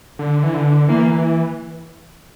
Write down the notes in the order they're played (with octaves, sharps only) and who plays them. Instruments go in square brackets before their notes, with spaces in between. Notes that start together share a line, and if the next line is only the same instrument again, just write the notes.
[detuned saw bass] D3
E3
D3
[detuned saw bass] E3 [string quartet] A#3